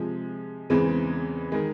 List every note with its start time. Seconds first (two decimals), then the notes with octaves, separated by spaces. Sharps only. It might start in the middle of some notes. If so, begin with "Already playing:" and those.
Already playing: C3 F3 G#3
0.70 E2 C#3 E3 G#3 C4
1.52 D#3 G#3